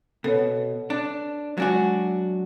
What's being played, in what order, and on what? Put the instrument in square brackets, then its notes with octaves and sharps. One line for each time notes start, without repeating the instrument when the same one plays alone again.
[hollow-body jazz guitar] B2 [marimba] A4 B4 C#5
[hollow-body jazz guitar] D4
[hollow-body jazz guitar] F#3 D4 F#4 [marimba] G#3 G#5